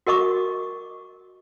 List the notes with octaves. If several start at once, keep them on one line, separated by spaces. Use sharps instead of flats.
F#4 A#4 D#5 C#6 D6